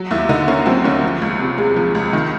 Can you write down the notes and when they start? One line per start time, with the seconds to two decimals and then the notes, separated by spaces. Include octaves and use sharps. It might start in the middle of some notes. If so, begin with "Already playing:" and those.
Already playing: F#3
0.11 D#2 E4
0.29 D3 D#4
0.48 A#3 C#4
0.66 F#3 C4
0.84 D#2 C#4
1.03 F3
1.22 C#2
1.40 C3
1.58 G#3
1.76 F3
1.95 C#2
2.13 D#3